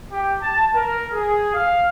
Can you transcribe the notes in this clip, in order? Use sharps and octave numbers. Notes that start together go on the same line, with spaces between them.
G4
A5
A#4
G#4
F5